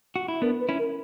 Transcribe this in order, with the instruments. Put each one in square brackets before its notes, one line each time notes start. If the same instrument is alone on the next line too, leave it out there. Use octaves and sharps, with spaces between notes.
[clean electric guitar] F#4
E4
[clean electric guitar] B3 D4 [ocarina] A#4
[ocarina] B4
[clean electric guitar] C#4 E4
[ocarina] A#4